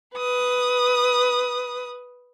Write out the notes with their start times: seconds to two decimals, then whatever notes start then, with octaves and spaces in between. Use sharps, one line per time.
0.16 B4 D#6